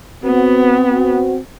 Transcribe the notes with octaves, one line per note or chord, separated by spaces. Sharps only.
B3 C4 F#4